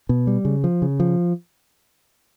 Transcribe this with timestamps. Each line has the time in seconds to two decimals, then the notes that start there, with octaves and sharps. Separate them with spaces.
0.09 B2
0.27 G3
0.45 C#3
0.64 F3
0.82 C#3
1.00 F3